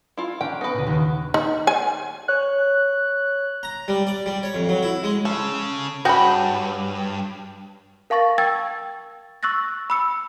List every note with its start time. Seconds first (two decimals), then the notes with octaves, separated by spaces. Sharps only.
0.17 E4 F4
0.41 A#3 C#4 D4 G5
0.61 B3 B4 A#6
0.74 C#2 A#2
0.87 D#2 F#5
1.34 D#4
1.67 G#5
2.28 C#5 F#6
3.63 A#5
3.88 G3
4.07 D5
4.26 G3
4.43 C#5
4.54 F2
4.69 F#3
4.83 E4
5.04 G#3
5.25 C#3 C#4 A4
6.05 G2 C#4 F#4 G#4 G5 B5
8.10 A#4 F5 A5 C#6 A6 A#6
8.38 G5 E6 G#6 A6
9.43 C#6 E6 F#6 A6 A#6
9.90 B5 E6 C#7